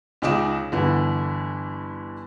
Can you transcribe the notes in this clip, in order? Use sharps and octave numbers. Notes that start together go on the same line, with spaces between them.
C#2 C#3 D#4 D6 E7
G1 D3 E3